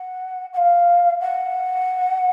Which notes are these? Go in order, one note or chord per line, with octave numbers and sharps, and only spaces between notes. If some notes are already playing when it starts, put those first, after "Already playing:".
Already playing: F#5
F#5
F5
F#5